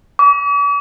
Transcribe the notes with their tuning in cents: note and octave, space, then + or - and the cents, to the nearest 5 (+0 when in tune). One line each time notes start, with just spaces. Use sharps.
D6 -45